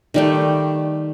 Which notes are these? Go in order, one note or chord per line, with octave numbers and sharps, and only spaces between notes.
D#3 G3 A3